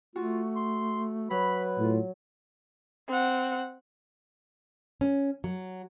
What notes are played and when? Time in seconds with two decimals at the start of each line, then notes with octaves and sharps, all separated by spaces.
0.16 A3 F4 F#4
0.56 C6
1.31 F#3 B4 B5
1.79 A2 F4
3.08 C4 F#5
5.01 C#4
5.44 F#3